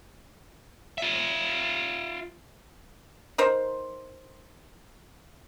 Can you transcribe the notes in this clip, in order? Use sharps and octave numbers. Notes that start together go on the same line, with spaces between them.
F4 E5
D#4 A#4 C5